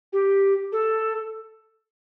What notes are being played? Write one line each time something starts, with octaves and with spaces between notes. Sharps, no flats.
G4
A4